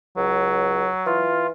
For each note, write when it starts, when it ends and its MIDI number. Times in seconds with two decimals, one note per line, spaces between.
0.17 0.89 37
0.17 1.25 54
1.06 1.51 52
1.06 1.47 65